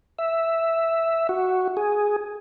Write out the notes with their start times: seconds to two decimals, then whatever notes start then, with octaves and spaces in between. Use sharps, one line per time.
0.19 E5
1.29 F#4
1.77 G#4